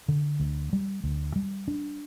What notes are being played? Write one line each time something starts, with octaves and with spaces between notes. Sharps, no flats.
D3
D2
G3
D2
G3
D4